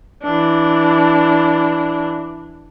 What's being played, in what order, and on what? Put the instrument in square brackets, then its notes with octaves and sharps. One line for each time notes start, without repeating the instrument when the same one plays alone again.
[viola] E3 D4